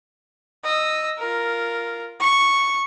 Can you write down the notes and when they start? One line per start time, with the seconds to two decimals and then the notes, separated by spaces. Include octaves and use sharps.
0.64 D#5 E6
1.18 F4 A#4
2.20 C#6